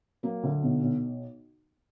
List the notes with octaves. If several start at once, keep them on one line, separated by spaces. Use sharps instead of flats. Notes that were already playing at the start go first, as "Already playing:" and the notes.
F#3 A#3
D2
B1
B1